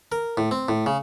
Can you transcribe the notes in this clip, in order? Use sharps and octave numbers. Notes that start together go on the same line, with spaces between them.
A#4
A2
C4
A2
C#3